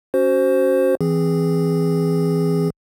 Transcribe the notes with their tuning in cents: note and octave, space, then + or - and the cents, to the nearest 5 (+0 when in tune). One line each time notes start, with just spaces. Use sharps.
C#4 +0 F#4 +20 C5 +5
E3 +0 C4 +0 G#4 -10